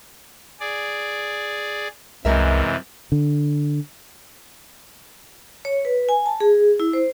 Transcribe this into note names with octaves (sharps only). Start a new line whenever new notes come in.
G#4 D5
C2 F#2 C3 E3 G#3 A#4 E5
D3
C#5
B4
G#5
A5
G#4
E4
C5